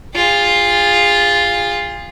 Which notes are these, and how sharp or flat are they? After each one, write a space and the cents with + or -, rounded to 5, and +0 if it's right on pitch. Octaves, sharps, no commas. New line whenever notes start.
F4 +0 G#4 -35